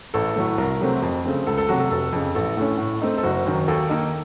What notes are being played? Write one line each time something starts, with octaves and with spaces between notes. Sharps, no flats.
A1 A4
A2 F#3 A3
C2 A#4
C3 F#3 A3 C4
F2
C#3 A3 C4
C#2 A4
A4
C3 F#3 A3 F#4
A4
F1 A4
F2 C#3
A1 A4
A2 A3 C#4
A2
A3 C4 D#4
A4
F#1 F#4
F#2 D#3 F#3
D#2 A4
D#3 A#3 D#4